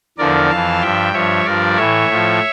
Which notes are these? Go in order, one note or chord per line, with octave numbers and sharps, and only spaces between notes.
E2 D3 F3 A#4 D5
F2 E3 F5 A5
G2 F3 E5 G5
G2 F3 C#5 E5
G2 F3 A#4 D5
A2 E3 C#5 E5
A2 F3